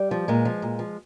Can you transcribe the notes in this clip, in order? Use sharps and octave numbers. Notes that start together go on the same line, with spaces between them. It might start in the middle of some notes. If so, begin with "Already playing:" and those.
Already playing: G3
F3
A#2 G#3
F3
A#2
F3